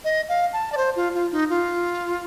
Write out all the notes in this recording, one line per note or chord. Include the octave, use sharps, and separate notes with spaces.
D#5
F5
A5
D5
C5
F4
F4
D#4
F4